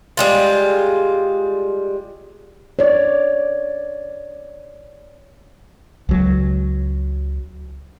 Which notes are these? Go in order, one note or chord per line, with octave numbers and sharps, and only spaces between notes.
G3 G#3 F4
C#5 D5
C#2 F#3